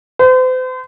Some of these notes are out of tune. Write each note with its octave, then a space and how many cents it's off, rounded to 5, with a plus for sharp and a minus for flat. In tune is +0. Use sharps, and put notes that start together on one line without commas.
C5 -40